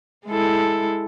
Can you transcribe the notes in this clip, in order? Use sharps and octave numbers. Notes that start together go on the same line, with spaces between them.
G#3 E4 A4